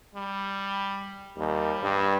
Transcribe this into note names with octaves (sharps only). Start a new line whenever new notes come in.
G3
D#2 G3
G2